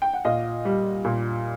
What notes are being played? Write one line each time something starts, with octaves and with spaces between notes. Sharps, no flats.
G5
F#5
A#2 D#5 F5
G3
A#2